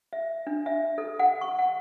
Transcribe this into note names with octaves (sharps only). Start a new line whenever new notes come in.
E5
D4
E5
A4
F#5
C#6
F#5